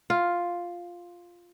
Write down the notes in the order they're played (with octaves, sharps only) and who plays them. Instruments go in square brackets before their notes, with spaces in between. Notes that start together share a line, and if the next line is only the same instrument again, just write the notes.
[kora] F4